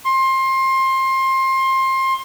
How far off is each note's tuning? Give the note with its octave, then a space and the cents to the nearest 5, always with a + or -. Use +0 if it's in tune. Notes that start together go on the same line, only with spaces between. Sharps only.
C6 +25